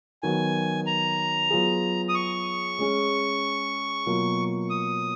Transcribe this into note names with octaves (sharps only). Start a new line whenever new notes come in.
D#3 F#3 B3 D#4 F#4 G#5
A#5
F#3 B3 F4 G#4
D#6
C#6
G#3 C#4 G#4
B2 F#3 A#3 F4
D#6